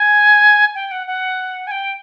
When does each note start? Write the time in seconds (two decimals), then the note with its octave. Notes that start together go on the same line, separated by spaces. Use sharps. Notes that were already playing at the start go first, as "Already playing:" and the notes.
Already playing: G#5
0.75 G5
0.91 F#5
1.07 F#5
1.67 G#5
1.71 G5